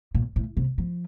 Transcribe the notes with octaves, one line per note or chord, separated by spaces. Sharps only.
A#2
A2
C3
F3